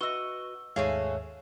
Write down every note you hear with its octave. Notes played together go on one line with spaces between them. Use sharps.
F#4 B4 D#5 C#6 E6 G7
D#2 G#2 A3 C#4 F#4 G#4 F5